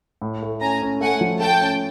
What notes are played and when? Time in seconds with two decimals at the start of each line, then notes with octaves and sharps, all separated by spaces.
0.22 A2
0.43 A3
0.61 C#4 G#5 A#5
0.82 C#4
1.01 A3 F#5 G#5
1.21 F3
1.40 A3 G5 A5
1.61 C#4